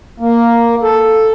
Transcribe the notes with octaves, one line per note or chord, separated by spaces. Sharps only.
A#3
A4